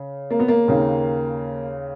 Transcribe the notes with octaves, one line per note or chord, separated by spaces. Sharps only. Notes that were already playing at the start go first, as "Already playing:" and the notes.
Already playing: C#3
A#3
B3
A#3
D#2 C#3